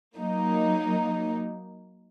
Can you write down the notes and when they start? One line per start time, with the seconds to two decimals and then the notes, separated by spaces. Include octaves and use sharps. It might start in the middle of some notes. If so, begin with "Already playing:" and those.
0.18 F#3 A#3 D#4